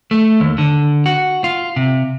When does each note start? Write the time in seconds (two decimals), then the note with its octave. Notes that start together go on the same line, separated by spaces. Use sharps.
0.11 A3
0.40 D#2
0.58 D3
1.06 F#4
1.44 F4
1.76 C3